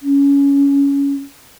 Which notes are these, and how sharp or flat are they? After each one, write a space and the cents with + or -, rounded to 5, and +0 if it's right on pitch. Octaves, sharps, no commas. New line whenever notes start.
C#4 +15